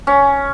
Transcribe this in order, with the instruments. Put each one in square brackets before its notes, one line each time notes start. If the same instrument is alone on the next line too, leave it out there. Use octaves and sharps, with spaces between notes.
[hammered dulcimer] C#4